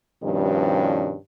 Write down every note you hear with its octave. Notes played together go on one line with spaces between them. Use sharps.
G2 B2 D#3 F3 G3 C#4